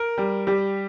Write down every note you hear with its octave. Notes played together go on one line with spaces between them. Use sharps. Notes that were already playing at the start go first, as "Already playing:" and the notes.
Already playing: A#4
G3
G3 G4